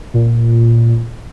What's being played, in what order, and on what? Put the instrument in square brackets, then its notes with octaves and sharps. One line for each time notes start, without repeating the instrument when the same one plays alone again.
[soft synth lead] A#2